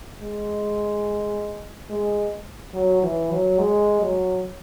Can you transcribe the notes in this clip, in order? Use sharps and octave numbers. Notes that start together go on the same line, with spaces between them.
G#3
G#3
F#3
E3
F#3
G#3
F#3